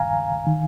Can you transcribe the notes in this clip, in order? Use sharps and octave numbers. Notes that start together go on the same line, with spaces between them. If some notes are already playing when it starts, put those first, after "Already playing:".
Already playing: G2 D#3 F5 G#5 A#5
D#3